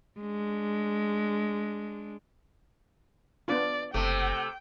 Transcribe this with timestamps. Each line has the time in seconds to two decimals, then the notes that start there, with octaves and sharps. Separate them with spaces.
0.20 G#3 D4
3.48 B3 D4 F4 D5
3.94 F#1 C3 A3 G5